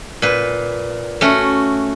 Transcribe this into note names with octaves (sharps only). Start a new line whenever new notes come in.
A#2 B4
A3 C#4 F#4